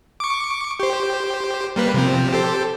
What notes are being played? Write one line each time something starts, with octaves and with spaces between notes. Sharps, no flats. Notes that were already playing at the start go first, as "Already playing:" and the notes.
C#6 D6
G4 C5
G3 A#3 B4
C3 F3 C4
G4 A4 C5